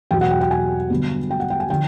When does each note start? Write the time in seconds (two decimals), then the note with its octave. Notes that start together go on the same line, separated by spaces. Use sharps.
0.11 E2 B2 F#3 G5
0.21 F#5
0.31 G5
0.41 G5
0.51 G#5
0.90 G2 D3 F#3 B3
1.31 G5
1.40 F#5
1.50 G5
1.60 G#5
1.70 D3 F3 G5